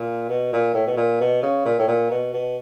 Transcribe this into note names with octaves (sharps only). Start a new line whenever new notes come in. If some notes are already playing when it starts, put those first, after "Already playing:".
Already playing: A#2
B2
A#2
A2
B2
A#2
B2
C#3
A#2
A2
A#2
B2
B2